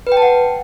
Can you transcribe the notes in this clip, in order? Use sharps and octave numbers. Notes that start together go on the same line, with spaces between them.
B4
G5
A5
F#5